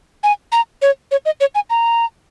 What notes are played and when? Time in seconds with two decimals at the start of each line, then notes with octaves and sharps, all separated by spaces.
0.23 G#5
0.52 A#5
0.82 C#5
1.11 C#5
1.26 D#5
1.41 C#5
1.55 G#5
1.70 A#5